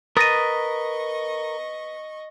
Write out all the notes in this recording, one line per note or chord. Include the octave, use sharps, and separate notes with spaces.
A#4 B4 D#5 C#6 D#6 A6 A#6 D#7